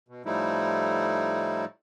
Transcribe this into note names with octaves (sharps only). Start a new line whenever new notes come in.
B2
A2 F3 G3 A3 D#4 E4